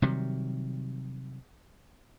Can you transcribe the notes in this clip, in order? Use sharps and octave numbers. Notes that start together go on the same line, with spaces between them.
C3 D#3 F#3 G3